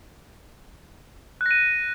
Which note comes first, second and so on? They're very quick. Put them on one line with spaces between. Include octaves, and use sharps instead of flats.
F#6 A#6 D#7